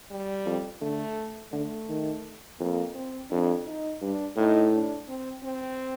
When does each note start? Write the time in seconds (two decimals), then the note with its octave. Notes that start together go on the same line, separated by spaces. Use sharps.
0.11 G3
0.46 F2
0.81 D3 A3
1.52 D3 A3
1.89 D#3
2.60 F2 A#3
2.95 C4
3.30 F2 D4
3.67 D#4
4.02 G2 D4
4.37 A2 D#4
4.73 D4
5.08 C4
5.44 C4